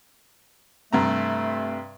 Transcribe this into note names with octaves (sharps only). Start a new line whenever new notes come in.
G2 C3 A3 A#5